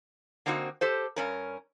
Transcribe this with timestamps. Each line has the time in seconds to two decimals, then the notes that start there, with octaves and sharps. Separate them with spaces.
0.46 D3 A#3 C4 D#4 F#4
0.81 G4 A4 C5
1.16 G2 C#4 A#4